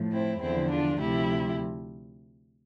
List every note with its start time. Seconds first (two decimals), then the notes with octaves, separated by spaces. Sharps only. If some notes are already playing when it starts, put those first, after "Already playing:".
Already playing: A2 F3
0.11 C4 E4
0.41 E2 D3 F3 C4 E4
0.70 D4 F4
1.00 D2 C3 F3 E4 G4